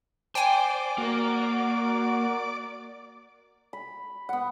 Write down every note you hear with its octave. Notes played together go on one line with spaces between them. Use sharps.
C5 D5 G5 G#5
A#3 F#4 A#4
B5
B3 F#5